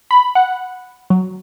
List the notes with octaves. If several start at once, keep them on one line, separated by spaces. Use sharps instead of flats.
B5
F#5
F#3